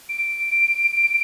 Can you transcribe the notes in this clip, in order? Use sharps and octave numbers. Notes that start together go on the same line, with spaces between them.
D7